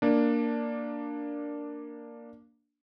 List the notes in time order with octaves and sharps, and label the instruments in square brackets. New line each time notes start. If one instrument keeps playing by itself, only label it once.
[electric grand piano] A#3 D4